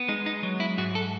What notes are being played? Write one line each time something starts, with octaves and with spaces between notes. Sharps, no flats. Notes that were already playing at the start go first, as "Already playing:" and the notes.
Already playing: B3
G#3 D#4
D#4
F#3
E4
G#2 F#4
A4